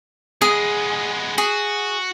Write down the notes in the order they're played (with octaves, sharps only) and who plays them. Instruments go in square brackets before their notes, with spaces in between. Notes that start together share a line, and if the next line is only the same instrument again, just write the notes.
[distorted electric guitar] G#3 B3 [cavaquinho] G#4
[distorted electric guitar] F#4 [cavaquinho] G#4